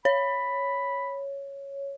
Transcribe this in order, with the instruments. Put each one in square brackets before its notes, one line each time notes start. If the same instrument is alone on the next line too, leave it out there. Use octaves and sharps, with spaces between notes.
[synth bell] C#5 [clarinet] B5